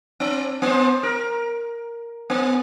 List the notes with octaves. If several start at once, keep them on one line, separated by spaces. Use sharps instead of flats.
C4
B3 C5
A#4
B3